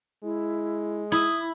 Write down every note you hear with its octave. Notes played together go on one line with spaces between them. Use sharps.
G#3 E4
E4 D#6